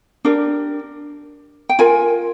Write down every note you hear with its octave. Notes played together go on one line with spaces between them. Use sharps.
D4 G4 A#4
G5
F4 A#4 G#5